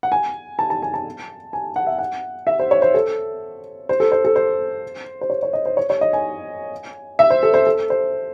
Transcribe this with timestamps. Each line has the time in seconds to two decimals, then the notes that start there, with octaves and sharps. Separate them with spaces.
0.03 F#5
0.12 G#5
0.59 A5
0.70 A5
0.82 G#5
0.94 A5
1.53 G#5
1.76 F#5
1.87 E5
1.98 F#5
2.47 E5
2.59 C5
2.71 C#5
2.82 C5
2.94 A4
3.89 C5
4.00 A4
4.12 C5
4.25 A4
4.36 C5
5.21 C5
5.30 C#5
5.43 C#5
5.53 D#5
5.65 C5
5.77 C#5
5.90 C#5
6.01 D#5
6.13 G#5
7.19 E5
7.30 C5
7.43 A4
7.54 C5
7.67 A4
7.90 C5